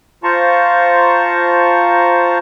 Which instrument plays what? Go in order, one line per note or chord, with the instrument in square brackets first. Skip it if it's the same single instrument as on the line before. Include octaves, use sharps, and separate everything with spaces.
[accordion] F4 C5 A5 A#5 C#6